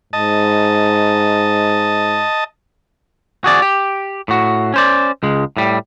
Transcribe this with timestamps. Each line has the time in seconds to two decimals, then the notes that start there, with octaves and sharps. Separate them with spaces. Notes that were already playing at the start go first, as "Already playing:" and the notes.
0.13 G#2 D#5 A5
3.44 F#4 G#4 D5
3.62 G4
4.28 A2 F#4
4.74 C#4 C5 D5
5.23 C#2 G#3
5.57 A2 G3